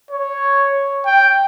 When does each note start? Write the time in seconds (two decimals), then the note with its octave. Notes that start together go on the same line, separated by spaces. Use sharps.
0.11 C#5
1.06 G5